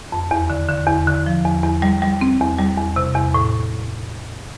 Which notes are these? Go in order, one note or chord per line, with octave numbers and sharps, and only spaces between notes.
F2
E2
D3
D3
E2
D3
F3
E2
E2
G3
G3
C4
E2
G3
E2
C3
E2
A2